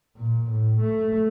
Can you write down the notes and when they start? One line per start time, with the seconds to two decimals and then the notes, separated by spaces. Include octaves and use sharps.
0.18 A#2
0.52 A2
0.81 A3